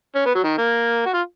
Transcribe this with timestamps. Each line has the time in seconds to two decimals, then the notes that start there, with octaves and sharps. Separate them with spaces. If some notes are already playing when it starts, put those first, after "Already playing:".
0.15 C#4
0.26 B3
0.35 F#3
0.43 D#3
0.58 A#3
1.06 F#4
1.14 F4